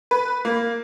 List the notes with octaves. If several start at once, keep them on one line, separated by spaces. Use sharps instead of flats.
B4
A#3